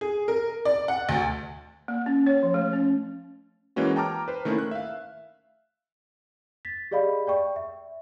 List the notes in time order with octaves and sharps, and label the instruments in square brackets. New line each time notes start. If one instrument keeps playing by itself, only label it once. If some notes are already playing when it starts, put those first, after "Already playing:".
[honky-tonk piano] G#4
A#4
D5
F#5
D2
[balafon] A#3
C#4
C#5
F3
A3
C#4
[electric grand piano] E3 G#3 A#3 C#4 F#4
G5 A5 A#5 D6 F6
B4 C5
D#3 A3 A#3 C#4 E4
F#6
E5 F5
[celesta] A6 B6
G4 G#4 D5 D#5 F5 B5
D5 G5 C#6
E5